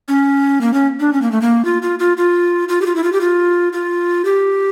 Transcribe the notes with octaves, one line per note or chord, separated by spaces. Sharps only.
C#4
A#3
C#4
D4
C#4
A#3
A3
A#3
F4
F4
F4
F4
F4
G4
F4
E4
F4
G4
F4
F4
G4